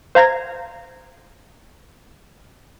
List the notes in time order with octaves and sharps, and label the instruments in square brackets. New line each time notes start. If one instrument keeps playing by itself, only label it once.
[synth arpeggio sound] C5 F5 A#5 G#6 A#6